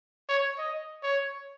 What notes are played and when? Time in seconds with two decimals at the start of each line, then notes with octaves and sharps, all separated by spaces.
0.29 C#5
0.58 D#5
1.03 C#5